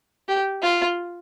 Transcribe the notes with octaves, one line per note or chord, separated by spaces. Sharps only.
G4
F4